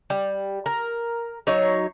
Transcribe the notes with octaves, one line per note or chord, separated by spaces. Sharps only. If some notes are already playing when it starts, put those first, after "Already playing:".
G3
A#4
F#3 D#4 C#5